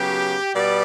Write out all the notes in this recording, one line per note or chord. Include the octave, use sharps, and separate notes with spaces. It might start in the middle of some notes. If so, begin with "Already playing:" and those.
Already playing: C#3 F#3 B3 G4
B2 G3 B3 D5